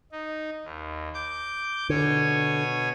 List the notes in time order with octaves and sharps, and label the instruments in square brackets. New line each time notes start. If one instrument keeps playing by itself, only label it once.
[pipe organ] D#4
D#2
D6 G6
[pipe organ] B2 C#5 G#5 [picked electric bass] D3